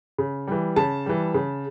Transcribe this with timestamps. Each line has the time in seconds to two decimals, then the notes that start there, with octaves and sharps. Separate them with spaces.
0.18 C#3
0.47 E3 G3
0.76 C#3 A5
1.06 E3 G3
1.34 C#3